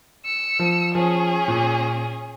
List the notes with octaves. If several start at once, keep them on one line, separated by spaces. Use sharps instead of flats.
E6 C#7
F3
F3 C#4 G#4
A#2